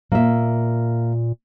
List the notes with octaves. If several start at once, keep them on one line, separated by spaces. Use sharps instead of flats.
A#2 A#3 E5